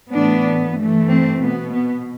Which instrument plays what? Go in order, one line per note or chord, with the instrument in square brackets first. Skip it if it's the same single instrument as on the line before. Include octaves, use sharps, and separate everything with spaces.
[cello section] A2 E3 B3 D4
G2 E3 A3
C4
B2 B3
B3